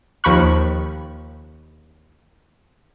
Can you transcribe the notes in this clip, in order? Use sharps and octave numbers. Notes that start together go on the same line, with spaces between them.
D#2 F3 B5 C#6 F#6